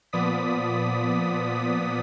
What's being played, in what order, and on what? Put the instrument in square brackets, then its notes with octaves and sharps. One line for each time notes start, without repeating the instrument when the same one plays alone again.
[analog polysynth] A#2 F3 B3 D5 D#6 B6